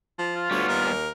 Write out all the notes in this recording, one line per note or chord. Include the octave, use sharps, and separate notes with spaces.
F3
F4
D2 G3 B3 C#5
D#2 A#4
D#2